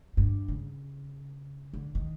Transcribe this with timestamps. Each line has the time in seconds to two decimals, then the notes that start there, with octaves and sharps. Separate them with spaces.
0.17 G2
0.48 C#3
1.74 D3
1.95 D#3